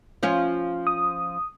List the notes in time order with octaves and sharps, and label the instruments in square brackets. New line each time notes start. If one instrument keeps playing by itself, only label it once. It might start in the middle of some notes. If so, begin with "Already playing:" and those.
[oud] F3 C#4 F4
[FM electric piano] D#6